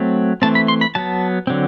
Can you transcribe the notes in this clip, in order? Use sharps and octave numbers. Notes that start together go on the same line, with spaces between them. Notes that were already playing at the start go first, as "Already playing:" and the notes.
Already playing: F#3 A3 C4
E3 A3 C4 A5
B5
C6
B5
F#3 B3 A5
D3 F#3 C4